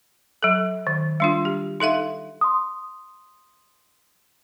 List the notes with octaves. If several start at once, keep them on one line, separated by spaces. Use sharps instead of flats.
F#3 A4
D#3
G3 D4 F4
G4
D#4 A4 E5 F5
C6 D#6